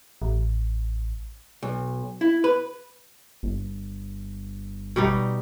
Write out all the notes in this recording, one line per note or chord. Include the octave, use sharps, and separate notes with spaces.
A1
B1
E4
B4
G1
B2 G3 D#4